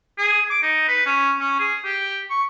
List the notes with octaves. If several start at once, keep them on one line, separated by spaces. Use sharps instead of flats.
G#4
D6
D#4
B4
C#4
C#4
G#4
G4
C#6